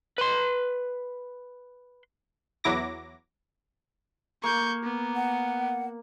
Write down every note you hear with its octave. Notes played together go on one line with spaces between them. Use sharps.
B4 C6
E2 F#3 E4 D6 A#6
A#3 C#6 G6
B3
F#5